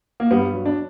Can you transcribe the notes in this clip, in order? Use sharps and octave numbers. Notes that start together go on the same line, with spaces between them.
A#3
G2 G3 B3
F#3
D4